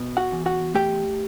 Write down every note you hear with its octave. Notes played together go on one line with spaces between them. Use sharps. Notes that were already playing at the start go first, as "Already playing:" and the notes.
Already playing: B2
F#4 F#5
E2
F#4 F#5
A3 G4 G5